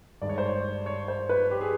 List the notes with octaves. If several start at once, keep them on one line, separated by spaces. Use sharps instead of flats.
G2 D#3 G#3 D5
C#5
C5
C#5
D5
C#5
C5
B4
G4
G#4